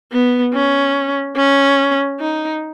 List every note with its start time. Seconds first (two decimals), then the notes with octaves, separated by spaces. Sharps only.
0.12 B3
0.54 C#4
1.36 C#4
2.20 D#4